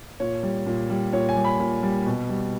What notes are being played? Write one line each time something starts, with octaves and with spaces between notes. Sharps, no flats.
A#2 C#5
G3
A#2
G3
A#2 C#5
G#5
G3
B5
A#2
G3
B2
G3